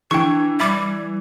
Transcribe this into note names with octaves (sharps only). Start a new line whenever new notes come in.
E3 D4 G5 C#6
G3 E5 B5 D6